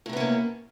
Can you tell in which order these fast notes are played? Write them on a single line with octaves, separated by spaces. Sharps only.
A2 C3 B3 C#4 A#3